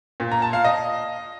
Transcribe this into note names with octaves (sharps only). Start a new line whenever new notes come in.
A#2
A#5
A5
F5
D#5